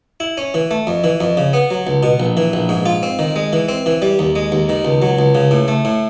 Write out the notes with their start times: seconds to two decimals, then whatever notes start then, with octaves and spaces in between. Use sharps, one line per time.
0.20 E4
0.38 C#4
0.54 E3
0.71 A3
0.87 F2
1.04 E3
1.20 F2
1.37 C#3
1.53 B3
1.71 F#3
1.87 C#2
2.03 B2
2.20 A#1
2.37 E3
2.53 A#1
2.69 G#2
2.86 F4
3.03 C4
3.19 D#3
3.36 G#3
3.53 E3
3.69 C4
3.86 E3
4.02 G3
4.19 D#2
4.36 G#3
4.52 D#2
4.69 D#3
4.85 C#2
5.02 F#3
5.19 C#2
5.35 C#3
5.51 A2
5.68 A3
5.85 A2